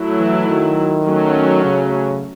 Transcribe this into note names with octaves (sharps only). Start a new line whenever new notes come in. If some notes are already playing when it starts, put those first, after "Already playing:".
Already playing: F#3 A3 E4
E3
D#3
F#3 A3 C#4
C#3